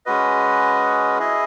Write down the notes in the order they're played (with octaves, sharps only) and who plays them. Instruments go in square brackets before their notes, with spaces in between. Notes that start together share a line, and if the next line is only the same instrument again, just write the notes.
[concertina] G#3 C#4 F#4 B4 D#5
E4 G#4 D#5